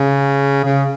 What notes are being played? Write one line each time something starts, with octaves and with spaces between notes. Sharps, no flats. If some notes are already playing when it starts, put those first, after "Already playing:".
Already playing: C#3
C#3